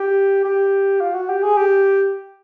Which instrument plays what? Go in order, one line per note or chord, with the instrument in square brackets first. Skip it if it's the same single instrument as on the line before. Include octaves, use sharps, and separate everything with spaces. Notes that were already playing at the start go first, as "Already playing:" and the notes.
Already playing: [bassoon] G4
G4
F4
F#4
G4
G#4
G4